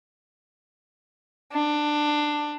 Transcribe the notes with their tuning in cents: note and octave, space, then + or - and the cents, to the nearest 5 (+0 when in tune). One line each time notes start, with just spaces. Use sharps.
D4 +15